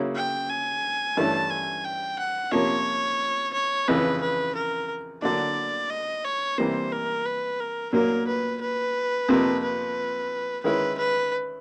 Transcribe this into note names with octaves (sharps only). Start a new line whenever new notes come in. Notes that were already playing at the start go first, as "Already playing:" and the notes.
Already playing: C#3 F#3 A#3 C#4 E4
G5
G#5
G2 E3 A3 C#4 E4 A5
G#5
G5
F#5
C3 F3 A#3 C#4 C#5
C#5
F2 C#3 E3 B4
B4
A#4
D3 F#3 A#3 D4 D5
D#5
C#5
C3 E3 G3 A#3 C5
A#4
B4
A#4
A#2 F#3 A#3 A#4
B4
B4
F2 C3 F3 A#3
B4
D#3 G#3 C#4 E4 B4
B4